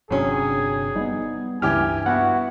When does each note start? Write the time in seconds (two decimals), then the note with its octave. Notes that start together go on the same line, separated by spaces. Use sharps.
0.11 G1 C3 F#3 C#4 D4 G#4
0.96 G3 A#3 B3 D#4
1.62 C#2 G2 E3 G4 G#5 D6 F6
2.06 B3 E4 F#4 F#5